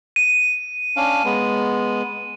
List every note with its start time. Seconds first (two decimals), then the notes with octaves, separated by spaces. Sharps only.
0.16 D#7
0.97 C#4 D4 F5
1.25 G#3 B3